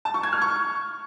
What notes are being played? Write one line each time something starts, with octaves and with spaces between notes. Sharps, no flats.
A5
C#6
G#6
F6
C#6